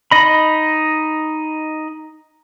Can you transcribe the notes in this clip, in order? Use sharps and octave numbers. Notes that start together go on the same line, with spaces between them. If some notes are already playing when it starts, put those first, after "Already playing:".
D#4 D#5 B5